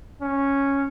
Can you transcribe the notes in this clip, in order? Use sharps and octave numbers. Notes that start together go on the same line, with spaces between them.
C#4